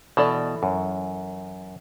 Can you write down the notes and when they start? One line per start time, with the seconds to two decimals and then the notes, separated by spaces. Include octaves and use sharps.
0.17 B2 E3 A4 D5
0.63 F#2